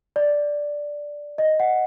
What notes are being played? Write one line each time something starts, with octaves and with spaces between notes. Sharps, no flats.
D5
D#5
F#5